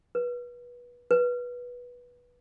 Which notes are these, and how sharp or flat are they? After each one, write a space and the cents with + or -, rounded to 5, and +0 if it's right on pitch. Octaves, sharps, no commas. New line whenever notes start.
B4 -25
B4 -15